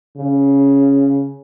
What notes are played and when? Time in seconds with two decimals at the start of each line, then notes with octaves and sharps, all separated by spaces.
0.17 C#3